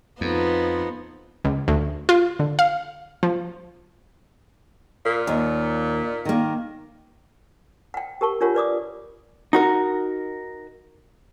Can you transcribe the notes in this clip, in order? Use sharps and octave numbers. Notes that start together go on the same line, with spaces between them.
F2 F3 B3 D#4
C#2
D2
F4
D3
F5
F3
A#2
D#2
D#3 A#3
F#5 G5
G4 A#4 A5 C#6
D4 F4 G4 A#4 C#5 F#5
B4 D5 D6 D#6
D#4 F#4 A#4